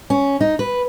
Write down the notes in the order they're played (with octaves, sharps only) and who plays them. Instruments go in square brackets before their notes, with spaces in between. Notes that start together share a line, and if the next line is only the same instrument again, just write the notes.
[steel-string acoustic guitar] C#4
D#4
B4